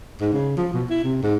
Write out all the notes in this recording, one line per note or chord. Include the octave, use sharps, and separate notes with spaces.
G#2
C#3
F3
B2
E4
C3
G#2